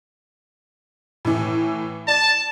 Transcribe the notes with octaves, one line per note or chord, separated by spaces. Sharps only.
A2 E3
D5 A5